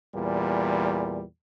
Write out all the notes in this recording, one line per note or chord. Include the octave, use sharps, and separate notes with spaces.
E2 A#2 G3